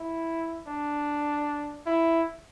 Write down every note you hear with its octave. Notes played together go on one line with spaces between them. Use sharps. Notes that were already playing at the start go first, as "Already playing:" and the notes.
Already playing: E4
D4
E4